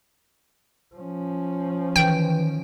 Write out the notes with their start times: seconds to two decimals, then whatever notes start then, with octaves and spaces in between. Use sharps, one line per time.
0.95 F3 C#4
1.96 D#3 E3 G5